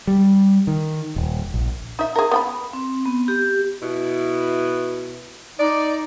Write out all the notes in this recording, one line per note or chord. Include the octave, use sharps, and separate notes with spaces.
G3
D#3
D#1
A#1
D#4 E5
G#4 A#4
B3 G5 B5
C4
B3
G4
B2 E4
D#4 D5